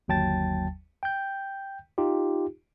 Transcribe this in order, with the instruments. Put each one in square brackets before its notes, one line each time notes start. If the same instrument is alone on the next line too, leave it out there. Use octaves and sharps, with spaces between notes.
[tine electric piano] G1 D#2 F#3 G5 A5 A6
G5 G6
D#4 F4 G4